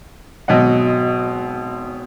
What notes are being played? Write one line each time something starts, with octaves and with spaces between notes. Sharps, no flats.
G#1 B2 F#3 D#5 F#5